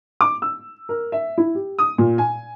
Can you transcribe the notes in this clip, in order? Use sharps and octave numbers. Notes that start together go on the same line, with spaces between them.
D6
E6
A#4
E5
E4
G4
D#6
A#2
G#5